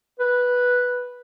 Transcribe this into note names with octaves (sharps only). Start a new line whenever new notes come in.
B4